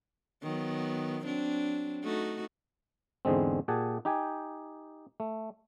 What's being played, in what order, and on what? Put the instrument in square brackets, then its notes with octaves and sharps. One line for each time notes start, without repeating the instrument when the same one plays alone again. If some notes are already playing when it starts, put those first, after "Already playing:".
[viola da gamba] D#3 F#3 B3
F#3 C4 D4
A3 D#4 F#4
[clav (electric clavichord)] E2 G#2 D3 G#3 C4
A#2 G4 G#4 F#5 G#5 A5
D#4 G4 G5 G#5
A3